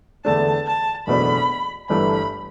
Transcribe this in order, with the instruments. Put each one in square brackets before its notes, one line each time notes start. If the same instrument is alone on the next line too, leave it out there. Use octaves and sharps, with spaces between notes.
[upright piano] E2 D3 A3 D4 [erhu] A5
[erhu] A5
[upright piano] F#1 E2 B2 A3 D4 [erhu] B5
[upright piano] G1 G2 E3 A3 [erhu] B5